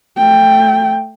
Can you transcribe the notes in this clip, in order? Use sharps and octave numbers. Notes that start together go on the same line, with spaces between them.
A3 G5